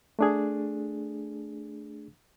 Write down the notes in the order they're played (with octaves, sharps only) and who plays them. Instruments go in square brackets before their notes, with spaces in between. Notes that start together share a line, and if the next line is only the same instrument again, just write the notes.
[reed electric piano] A3 D4 G#4